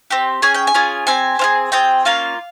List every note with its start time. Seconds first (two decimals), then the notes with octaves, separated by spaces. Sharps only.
0.10 C4 G4
0.42 C#4 G#4 G#5
0.54 G5
0.67 G#5
0.74 C#4 F4 G#4
1.07 C4 G4 G#5
1.39 C4 F4 G#4
1.72 C4 F4 G#4 G5
2.05 A#3 C#4 F4 F5